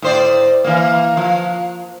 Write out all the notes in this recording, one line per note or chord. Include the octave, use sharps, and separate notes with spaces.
A2 C5 D5
E3 A#3
F3